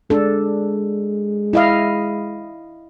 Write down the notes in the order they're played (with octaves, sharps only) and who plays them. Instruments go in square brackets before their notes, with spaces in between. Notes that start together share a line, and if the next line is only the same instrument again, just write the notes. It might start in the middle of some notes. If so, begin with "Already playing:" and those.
[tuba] G#3 [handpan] D4 A4
[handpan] E4 D#5 F5